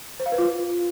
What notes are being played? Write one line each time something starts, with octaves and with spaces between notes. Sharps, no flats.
C5
F5
B4
F4